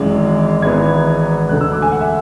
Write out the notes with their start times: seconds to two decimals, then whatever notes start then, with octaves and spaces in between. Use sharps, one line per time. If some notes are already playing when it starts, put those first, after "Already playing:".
Already playing: G#1 F#2 E3 G#3
0.62 G#1 G#2 E3 B3 G#6
1.49 E1 D2 D3 F#6
1.61 E6
1.72 D6
1.82 G#5
1.92 F#5
2.01 E5